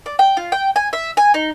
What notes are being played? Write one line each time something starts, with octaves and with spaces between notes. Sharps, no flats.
D5
G5
F4
G5
G#5
E5
G#5
D#4